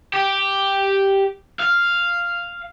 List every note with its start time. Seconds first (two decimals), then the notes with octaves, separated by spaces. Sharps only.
0.14 G4
1.60 F5